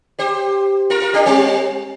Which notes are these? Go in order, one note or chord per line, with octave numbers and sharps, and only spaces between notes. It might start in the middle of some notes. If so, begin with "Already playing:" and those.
G4 C5
F4 A#4
F4 A#4
D4 G4
G3 C4